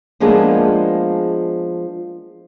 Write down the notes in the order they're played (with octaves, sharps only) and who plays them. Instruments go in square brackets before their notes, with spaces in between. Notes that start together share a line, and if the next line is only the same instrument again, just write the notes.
[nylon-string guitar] F3 G#3 A#3 B3 D4 G#4